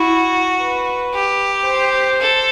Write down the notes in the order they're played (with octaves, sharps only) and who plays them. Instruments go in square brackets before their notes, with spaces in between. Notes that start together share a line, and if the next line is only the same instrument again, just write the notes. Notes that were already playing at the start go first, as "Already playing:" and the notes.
Already playing: [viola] E4 [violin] F#4
[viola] B4
[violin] G4
[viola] C5
[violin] A4